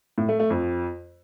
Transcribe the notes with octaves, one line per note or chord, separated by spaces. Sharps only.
A2
A3
A3
F2